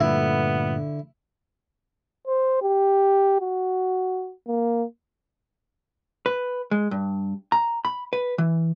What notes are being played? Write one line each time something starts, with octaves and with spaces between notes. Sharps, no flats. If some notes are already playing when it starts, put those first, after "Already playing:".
G2 A#2 D3 A3 B3 E4
C5
G4
F#4
A#3
B4
G#3
G2
A#5
B5
B4
E3